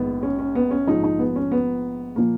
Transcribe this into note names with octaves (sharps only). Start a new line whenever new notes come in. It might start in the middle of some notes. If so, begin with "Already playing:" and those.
Already playing: A#1 G#2 D#3 B3
C#4
C#4
B3
C#4
A#1 G#2 F3 D#4
D#4
B3
C#4
B3
A#2 F3 A#3